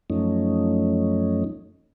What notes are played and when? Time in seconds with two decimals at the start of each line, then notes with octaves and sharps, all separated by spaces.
0.10 F#2 F3 A3 C#4 D#4